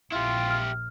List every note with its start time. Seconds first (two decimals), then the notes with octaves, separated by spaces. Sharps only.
0.12 A#1 E4 F4 G4
0.51 F6